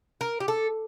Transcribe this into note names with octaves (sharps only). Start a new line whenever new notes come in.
A#4
G4
A4